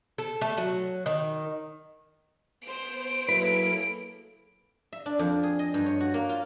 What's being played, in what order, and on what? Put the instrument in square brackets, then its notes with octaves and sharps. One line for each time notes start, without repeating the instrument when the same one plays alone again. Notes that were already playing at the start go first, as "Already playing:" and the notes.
[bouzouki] A4
A3
F#3
D#3
[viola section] B3 C5 [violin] D7
[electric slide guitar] F#3 E4 B4 [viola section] A#3 G#4 A4
[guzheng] E5
D4
F2
G#4
D#5
G2
C#5
F#4
A#3
F4